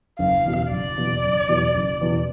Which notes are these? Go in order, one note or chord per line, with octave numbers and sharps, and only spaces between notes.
F#1 F5
E2 B2 F#3
F#1 D5
E2 B2 F#3
F#1
E2 B2 F#3
F#1
E2 B2 F#3